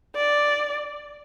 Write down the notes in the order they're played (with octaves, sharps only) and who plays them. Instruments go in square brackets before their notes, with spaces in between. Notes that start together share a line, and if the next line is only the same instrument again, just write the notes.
[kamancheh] D5